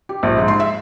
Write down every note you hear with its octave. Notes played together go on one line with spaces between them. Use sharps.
G4
A#1
G#2
C6
E5